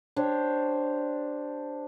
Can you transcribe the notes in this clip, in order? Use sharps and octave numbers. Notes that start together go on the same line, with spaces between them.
D4 G4 C5 C#5